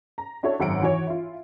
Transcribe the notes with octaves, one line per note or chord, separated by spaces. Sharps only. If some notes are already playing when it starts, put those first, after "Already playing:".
A#5
D4 E4 F#4 A4 C#5
G#1 F#2 F#5 C#7 D7
E3 F#4 C#5
E4 F4